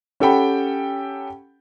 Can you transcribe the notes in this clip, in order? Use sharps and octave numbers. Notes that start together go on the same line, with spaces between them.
C#4 G4 A4 F#5 G5 B5